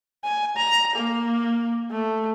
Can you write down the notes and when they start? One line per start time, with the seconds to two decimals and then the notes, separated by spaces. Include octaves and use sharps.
0.25 G#5
0.57 A#5
0.96 A#3
1.91 A3